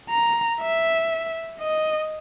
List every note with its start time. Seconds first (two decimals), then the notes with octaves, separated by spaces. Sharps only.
0.10 A#5
0.61 E5
1.60 D#5